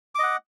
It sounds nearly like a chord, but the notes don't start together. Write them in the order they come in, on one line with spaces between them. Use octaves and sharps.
D6 D#5 F#5